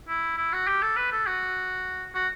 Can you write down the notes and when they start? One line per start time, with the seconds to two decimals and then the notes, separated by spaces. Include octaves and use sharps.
0.08 E4
0.38 E4
0.53 F#4
0.67 G4
0.82 A4
0.97 B4
1.12 A4
1.27 F#4
2.14 F#4